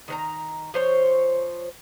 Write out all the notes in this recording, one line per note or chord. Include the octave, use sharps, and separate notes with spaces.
D#3 B4 A#5
F3 C5 C#5